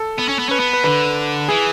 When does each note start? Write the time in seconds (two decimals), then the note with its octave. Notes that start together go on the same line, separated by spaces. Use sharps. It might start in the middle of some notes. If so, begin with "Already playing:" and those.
Already playing: A4
0.19 B3
0.29 C#4
0.39 B3
0.49 C#4 B4
0.60 B3
0.73 B4
0.84 D3 B4
1.48 E3 G#4